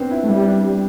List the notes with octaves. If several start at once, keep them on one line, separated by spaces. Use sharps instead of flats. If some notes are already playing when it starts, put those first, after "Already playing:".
Already playing: B3 C4 D4
E4
A3
G3 E4
D4